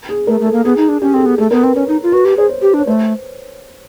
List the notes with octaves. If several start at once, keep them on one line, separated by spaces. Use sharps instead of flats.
G#4
A3 A#4
A3
A4
A#3
B3 G#4
D#4
D4
C#4 G4
C4 A4
G#4
B3
A3 A4
B3 A#4
C4 B4
C#4 C#5
D#4
F4
F#4 B4
G4
G#4 C5
C#5
G4
D4
C#5
A3 C5